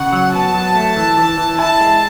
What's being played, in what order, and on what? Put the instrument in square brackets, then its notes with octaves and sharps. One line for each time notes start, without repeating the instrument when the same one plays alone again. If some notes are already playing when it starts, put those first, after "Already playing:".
Already playing: [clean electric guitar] C#3 [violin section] F#5
[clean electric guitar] F#3
[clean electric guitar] B3 [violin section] A5
[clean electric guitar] F#3
A3
E3
E3
E3
[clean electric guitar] E4 [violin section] A5
[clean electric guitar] G#3